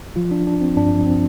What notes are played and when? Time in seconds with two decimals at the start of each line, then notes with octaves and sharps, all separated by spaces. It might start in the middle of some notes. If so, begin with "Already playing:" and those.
0.16 F3 F4
0.31 D4
0.37 G1
0.47 D4
0.57 G1 C4
0.76 G2 D4
0.96 F3
1.06 C4